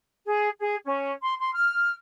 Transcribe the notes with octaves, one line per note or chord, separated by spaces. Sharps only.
G#4
G#4
C#4
C6
C6
F6